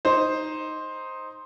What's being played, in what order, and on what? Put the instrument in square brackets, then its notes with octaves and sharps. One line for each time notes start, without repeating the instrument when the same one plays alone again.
[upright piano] D#4 C5